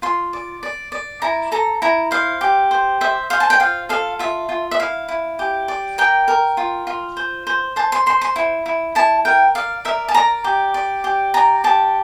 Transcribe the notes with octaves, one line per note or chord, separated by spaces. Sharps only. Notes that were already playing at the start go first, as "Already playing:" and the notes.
F4 C6
D5
D5
D5
E4 A#5
A4 A#5
E4 A#5
C5 F5
G4
C5
C5 E5
C5 F5
A5
G5
F4 F5
A4 F5
F4 E5
F4
E5
E4 F5
E4
G4
D5
A#4 G5
A#4
F4
F4
C5
C5
C5 A5
C6
C5 C6
C6
E4
E4
E4 A5
A#4 G5
D5 F5
A#4 E5
A5
D5 A#5
G4
D5
G4
D5 A#5
G4 A5